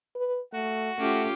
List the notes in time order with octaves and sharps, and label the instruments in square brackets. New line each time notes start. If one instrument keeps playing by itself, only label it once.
[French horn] B4
[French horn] A3 [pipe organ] F#4
[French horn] A3 [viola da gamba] C#4 F4 G4